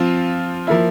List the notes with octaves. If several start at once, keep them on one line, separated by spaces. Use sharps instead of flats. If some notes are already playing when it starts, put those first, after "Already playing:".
Already playing: F3 C4 F4
F3 A#3 E4